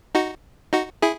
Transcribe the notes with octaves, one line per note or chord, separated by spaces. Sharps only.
D#4 F#4
D#4 F#4
E4 G#4